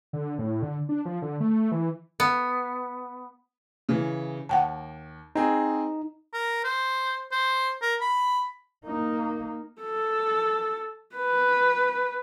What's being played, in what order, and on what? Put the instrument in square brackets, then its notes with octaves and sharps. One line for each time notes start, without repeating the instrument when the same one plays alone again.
[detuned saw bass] D3
A2
D3
D4
F3
D3
A3
E3
[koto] B3
[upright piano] C#3 E3
[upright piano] D#2 [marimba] F#5 G5 A5
[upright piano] C4 G#4 [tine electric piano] D#4
[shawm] A#4
C5
C5
A#4
B5
[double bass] A#3 D#4
[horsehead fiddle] A4
B4